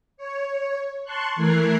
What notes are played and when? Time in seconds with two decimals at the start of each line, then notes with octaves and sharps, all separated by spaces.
0.17 C#5
1.04 A5 C6 C#6 F#6
1.36 E3 A3 A#4 F#6 G#6 C7